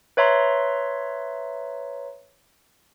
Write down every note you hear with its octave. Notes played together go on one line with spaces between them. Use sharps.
B4 C#5 E5 A#5 C6